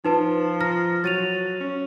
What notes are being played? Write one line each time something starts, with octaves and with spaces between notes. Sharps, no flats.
F3 D#4 B4 A5
A#5 F6 A#6
F#3 A6 D#7 F7
C#4